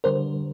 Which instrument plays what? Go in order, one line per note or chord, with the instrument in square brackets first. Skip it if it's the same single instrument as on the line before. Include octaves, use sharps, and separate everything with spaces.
[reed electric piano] D3 G3 [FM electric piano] A#4 C5